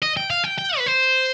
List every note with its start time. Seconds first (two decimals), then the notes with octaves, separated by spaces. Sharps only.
0.03 D#5
0.17 G5
0.30 F5
0.44 G5
0.58 G5
0.78 B4
0.86 C5